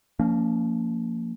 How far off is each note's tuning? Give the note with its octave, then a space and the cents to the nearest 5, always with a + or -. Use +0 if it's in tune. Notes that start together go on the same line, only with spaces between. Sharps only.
F3 +0 A#3 -20 C#4 +35